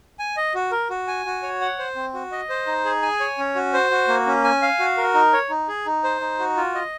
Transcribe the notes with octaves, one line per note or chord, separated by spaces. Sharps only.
G#5
D#5
F#4
A#4
F#4
G#5
F#4
C#5
F#5
C5
C4
F#4
D#5
C5
D#4
G#4
G#5
C#5
C#4
F#4
C5
F#4
A#3
C#4
G#5
F5
F#4
A#4
D#4
C#5
D#4
G#4
D#4
C5
D#4
F#4
F4
D#5